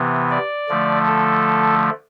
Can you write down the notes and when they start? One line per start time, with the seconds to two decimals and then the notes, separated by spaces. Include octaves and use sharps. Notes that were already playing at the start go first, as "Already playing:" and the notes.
Already playing: C3 E3 B3
0.31 D5
0.69 D3 F3 A3
1.06 A4